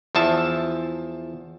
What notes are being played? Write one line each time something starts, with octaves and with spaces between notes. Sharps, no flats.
E2 F3 E5 A5